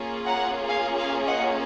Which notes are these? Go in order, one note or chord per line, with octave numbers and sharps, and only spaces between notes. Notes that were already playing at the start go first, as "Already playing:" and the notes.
Already playing: A#3 C#4 F4 G#4
F#5 A#5
F5 G#5
F5 G#5
D#5 F#5